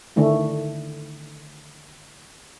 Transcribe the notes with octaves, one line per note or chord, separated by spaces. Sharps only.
D3 D#3 A3 D4 E4